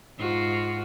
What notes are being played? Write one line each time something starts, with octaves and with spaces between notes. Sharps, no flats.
G#2 F4 F#4